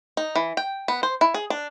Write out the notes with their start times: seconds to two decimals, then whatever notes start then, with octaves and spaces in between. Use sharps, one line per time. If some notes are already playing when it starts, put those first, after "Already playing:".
0.17 D#4
0.36 E3
0.57 G5
0.88 B3
1.03 C5
1.21 E4
1.34 G#4
1.50 D4